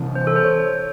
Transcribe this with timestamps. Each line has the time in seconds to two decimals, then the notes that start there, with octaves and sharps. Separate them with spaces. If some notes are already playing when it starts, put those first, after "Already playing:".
Already playing: C3 E3 C4
0.15 C5
0.27 A4
0.36 C5
0.44 C#5